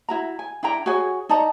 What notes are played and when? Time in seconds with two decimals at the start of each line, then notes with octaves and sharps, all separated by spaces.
0.09 E4 F#4 A#5
0.39 G#5
0.63 D4 E4 G5 A#5
0.86 F#4 G#4 C#5 G#5
1.29 D#4 D5 A5 A#5